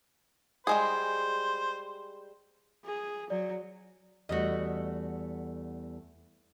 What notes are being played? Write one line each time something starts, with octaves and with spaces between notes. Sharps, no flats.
G3 G#3 G#4 C5
G#4
F#3 D5
E2 G3 A3 F#4 D#5